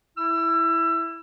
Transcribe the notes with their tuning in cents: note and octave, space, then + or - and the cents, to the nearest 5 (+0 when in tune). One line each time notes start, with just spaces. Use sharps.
E4 +0 E6 +30